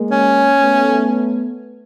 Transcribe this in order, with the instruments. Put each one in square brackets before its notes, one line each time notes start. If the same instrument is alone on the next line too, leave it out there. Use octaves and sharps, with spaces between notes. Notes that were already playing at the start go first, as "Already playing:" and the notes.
Already playing: [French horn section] G#3 A#3
[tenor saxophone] C#4
[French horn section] A3 B3